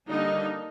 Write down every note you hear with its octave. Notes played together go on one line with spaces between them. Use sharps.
D3 G3 A#3 D4 D#4